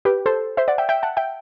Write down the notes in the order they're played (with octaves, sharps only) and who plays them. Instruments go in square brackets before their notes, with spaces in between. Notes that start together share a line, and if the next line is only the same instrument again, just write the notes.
[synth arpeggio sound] G4 B4
A4 C5
C5 E5
D5 F#5
E5 G5
E5 G5
F#5 A5
E5 G5